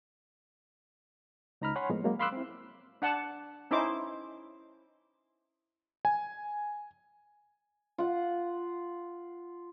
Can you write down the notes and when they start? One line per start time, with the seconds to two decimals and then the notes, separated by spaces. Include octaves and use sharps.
1.61 C#2 D#4 A#5 B5 F6
1.76 C#5 F#5 G#5 B5 C6
1.89 A2 F3 G#3 A#3 B3
2.04 F#3 G#3 A#3 C#4
2.19 F5 B5 C6 D6 E6 F#6
2.33 C4 E4
3.02 D4 F#5 A5
3.71 C#4 D#4 E4 C5 D6
6.05 G#5
7.98 F4 F#5